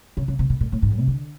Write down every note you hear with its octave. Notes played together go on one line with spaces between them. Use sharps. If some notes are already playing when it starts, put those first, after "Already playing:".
C#3
C#3
C3
B2
A#2
A2
G#2
F#2
C3
D3